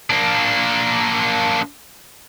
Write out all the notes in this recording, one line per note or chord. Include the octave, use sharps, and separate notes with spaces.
A#3 D4